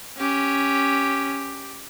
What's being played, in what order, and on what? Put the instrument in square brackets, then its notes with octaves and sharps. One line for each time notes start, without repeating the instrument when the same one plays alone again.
[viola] C#4 [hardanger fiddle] G4